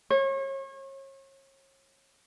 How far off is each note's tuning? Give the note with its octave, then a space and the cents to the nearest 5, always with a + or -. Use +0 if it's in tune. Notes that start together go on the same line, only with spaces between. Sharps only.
C#5 -35